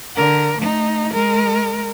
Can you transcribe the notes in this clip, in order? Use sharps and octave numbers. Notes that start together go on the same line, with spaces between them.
D3 A#4
A3 D#4
G#3 A#4